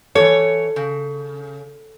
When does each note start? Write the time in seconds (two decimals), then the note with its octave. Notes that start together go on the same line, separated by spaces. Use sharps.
0.15 E3 A4 C#5
0.76 C#3